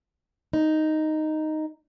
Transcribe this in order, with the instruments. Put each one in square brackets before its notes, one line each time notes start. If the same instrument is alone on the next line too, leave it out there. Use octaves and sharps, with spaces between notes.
[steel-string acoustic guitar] D#4